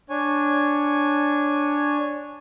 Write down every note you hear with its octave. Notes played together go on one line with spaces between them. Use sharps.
D4 C#5 G#5